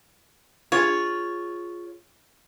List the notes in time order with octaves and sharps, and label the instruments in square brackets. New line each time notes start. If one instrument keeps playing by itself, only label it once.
[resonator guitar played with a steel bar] F4 G#4 [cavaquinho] C#5